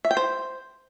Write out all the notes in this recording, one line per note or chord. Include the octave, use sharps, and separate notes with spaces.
E5
G5
C5